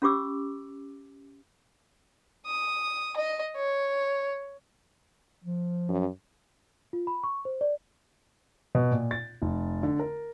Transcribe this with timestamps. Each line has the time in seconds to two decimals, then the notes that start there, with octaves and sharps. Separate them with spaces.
0.02 C#4 F4 G4 D6 E6
2.46 D#6
3.17 D#5
3.56 C#5
5.44 F3
5.89 F#2
6.93 F4
7.07 B5
7.24 C#6
7.45 C5
7.61 D5
8.75 B2
8.91 A#2
9.11 A6
9.42 F1
9.83 D3
9.99 A#4